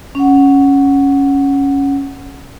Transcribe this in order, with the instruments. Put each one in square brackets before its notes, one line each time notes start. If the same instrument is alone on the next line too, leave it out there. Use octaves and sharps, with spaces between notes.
[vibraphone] C#4 F#5